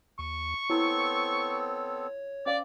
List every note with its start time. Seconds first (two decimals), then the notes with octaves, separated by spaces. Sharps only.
0.19 D#2 C#6
0.70 B3 C4 E4 A4 C#5
2.46 C#4 C5 D5 F5